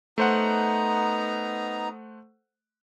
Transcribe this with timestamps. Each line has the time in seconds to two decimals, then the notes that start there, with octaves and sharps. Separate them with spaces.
0.18 A3 B3 D#4 C5 F#5 A#5